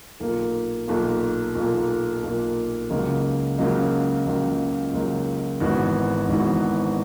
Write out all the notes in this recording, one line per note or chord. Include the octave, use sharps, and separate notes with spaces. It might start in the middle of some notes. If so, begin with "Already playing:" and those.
B1 A#2 A#3
B1 A#2 A#3
B1 A#2 A#3
B1 A#2 A#3
C#2 C#3 F#3 A#3 D#4
C#2 C#3 F#3 A#3 D#4
C#2 C#3 F#3 A#3 D#4
C#2 C#3 F#3 A#3 D#4
G#1 G#2 E3 B3 F#4
G#1 G#2 E3 B3 F#4